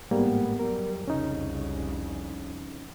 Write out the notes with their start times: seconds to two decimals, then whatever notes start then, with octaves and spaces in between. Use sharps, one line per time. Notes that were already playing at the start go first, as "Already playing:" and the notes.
0.11 A1 G#2 G3 A#3 B3
0.59 F#2 G3 A#4
1.08 C2 F2 C#3 C#4 D#4